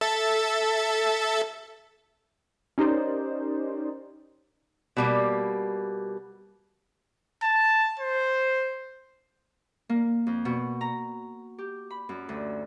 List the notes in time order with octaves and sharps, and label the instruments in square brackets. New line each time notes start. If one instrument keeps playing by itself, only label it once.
[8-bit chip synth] A4 E5 A6
[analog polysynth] C#4 D#4 G4 A#4 C5 D5
[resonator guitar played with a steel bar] B2 G3 A#3
[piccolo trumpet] A5
C5
[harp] A#3
F2
B2
A#5
G4
B5
F#2
D2